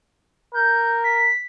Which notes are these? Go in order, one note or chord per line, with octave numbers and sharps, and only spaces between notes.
A#4 G6
B6